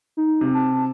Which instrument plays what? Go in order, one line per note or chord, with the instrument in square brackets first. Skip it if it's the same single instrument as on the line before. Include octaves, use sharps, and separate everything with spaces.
[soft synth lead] D#4
[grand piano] C3
[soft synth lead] A5